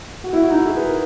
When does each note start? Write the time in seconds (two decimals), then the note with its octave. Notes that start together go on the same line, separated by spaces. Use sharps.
0.24 F#4
0.33 E4
0.43 F#4
0.50 D#4
0.55 E4
0.66 G#4
0.77 B4
0.86 A#4